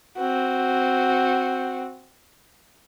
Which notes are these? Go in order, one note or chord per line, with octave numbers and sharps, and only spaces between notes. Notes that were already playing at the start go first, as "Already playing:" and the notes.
C4 F#4